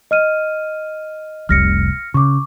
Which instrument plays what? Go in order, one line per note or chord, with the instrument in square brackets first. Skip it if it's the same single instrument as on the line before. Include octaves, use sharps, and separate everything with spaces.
[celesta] D#5 F6 D#7
[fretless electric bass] F1 C2 G3 [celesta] F6 A#6 C#7
[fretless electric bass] C#3 [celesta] C#6 D6